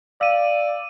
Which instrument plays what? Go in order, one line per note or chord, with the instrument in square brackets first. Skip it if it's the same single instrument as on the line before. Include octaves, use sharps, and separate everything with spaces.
[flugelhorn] D5 [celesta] F5 [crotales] E6 D#7